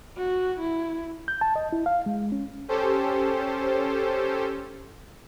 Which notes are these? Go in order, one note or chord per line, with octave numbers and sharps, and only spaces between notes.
F#4
E4
G6
A5
D#5
E4
F5
G#3
C#4
C#4 G4 A4 C5